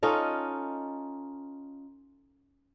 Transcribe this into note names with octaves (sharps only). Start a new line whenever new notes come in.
C#4 D#4 F4 A4